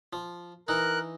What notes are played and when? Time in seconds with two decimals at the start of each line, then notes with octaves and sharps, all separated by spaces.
0.13 F3
0.68 E3 D#4 A#4 F#6